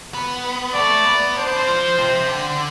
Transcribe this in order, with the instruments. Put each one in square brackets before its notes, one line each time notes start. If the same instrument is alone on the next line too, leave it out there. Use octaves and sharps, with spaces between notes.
[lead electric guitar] B3
[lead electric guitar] A3 [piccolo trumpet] D5
[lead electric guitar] B3
[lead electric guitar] D4 [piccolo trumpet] C5
[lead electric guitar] D4
C4
F3
C3
D3